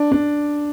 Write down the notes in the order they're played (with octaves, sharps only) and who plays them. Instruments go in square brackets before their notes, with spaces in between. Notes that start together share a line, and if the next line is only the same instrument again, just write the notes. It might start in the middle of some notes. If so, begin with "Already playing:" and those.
Already playing: [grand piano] D4
D4